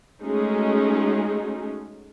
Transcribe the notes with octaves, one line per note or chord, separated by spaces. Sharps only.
G#3 A3 C#4 D#4 F#4 G#4